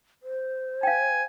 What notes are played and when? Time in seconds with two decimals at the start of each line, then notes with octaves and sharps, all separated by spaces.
0.23 C5
0.83 F5 G5 G#5